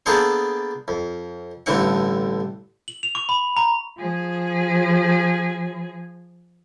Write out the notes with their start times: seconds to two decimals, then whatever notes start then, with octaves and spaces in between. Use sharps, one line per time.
0.06 A#3 B3 D4 G#4 A4 C5
0.88 F2
1.66 A1 G2 D3 C4 F#5
2.88 F#7
3.03 F7
3.15 C#6
3.29 B5
3.57 A#5
3.96 F3 G#4